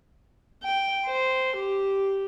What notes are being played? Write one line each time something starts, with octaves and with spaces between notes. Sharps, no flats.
G5
C5
G4